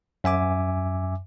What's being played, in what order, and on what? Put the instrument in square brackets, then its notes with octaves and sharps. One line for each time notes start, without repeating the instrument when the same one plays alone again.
[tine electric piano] F#2 E5 G#5 D6